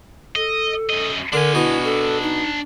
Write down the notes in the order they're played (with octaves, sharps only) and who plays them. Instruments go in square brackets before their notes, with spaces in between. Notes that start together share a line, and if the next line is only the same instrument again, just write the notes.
[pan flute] A4 [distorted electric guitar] D#5
[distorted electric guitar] F#2 D#5
[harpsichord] D3 [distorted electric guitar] D4 G#5 [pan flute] A#4
[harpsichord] B2 [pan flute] E4
[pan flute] A4
D#4